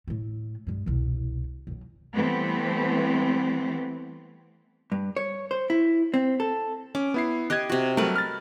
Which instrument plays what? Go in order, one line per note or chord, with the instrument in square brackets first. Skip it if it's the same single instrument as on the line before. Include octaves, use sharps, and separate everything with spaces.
[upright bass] A2 A3
G2 G#3
E1 C2
B1 B2
[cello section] E3 G3 A3 B3 C4
[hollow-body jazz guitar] G2
C#5
C5
E4
C4
A4
[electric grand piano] C#4 [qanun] D6
[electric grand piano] B3 E4 C7
[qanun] G4 D#5 [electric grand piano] F#6 G#6
[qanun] C3 F#4
[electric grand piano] F#3 G3 A3 [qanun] A#4 B4
[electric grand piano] F6 A6